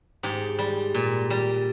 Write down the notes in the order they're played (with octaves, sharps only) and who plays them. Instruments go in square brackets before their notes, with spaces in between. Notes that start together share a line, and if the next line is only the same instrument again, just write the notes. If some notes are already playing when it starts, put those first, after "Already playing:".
[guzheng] G#2 G4
G3
A#2
G3